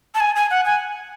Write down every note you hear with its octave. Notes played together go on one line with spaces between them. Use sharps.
A5
G#5
G#5
F#5
G#5